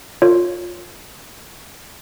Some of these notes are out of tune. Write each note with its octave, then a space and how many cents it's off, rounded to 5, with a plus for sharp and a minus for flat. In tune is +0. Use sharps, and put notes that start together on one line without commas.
F4 +15 A#4 -30 C#5 -10